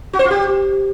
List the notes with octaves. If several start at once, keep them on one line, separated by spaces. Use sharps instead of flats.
F#4
C5
F4
G4